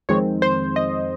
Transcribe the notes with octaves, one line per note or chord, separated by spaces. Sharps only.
F2 D#3 G#3 C4 C#5
C5
D#5